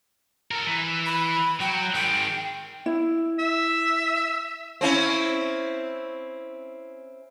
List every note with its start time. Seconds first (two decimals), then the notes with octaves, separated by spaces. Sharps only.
0.51 A4 A#4
0.67 E3
1.06 B5
1.60 F#3 G5
1.95 D#3 G#3 G5
2.86 E4
3.39 E5
4.81 C4 C#4 E4